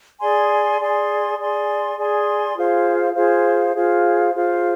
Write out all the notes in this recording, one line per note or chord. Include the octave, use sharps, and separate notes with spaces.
G#4 D5 G#5 C6
G#4 D5 G#5 C6
G#4 D5 G#5 C6
G#4 D5 G#5 C6
F4 G#4 C5 F5
F4 G#4 C5 F5
F4 G#4 C5 F5
F4 G#4 C5 F5